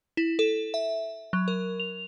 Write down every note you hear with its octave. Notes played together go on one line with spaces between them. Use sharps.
E4
A4
E5
F#3
A#4
F7